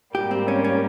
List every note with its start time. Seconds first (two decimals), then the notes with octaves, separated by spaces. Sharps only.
0.14 G#2 G3 A#3 G4
0.31 C4
0.48 C#4
0.64 C#4